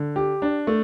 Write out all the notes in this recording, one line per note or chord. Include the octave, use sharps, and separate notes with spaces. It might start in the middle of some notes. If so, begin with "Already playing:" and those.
Already playing: D3
G4
D4
A3